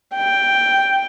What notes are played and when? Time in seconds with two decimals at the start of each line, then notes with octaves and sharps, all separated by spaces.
0.16 G5